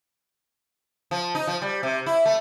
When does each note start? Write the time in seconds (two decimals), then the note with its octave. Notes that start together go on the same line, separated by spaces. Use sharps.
1.11 F3
1.35 D#4
1.47 F3
1.62 G3
1.83 C3
2.06 E4
2.26 A3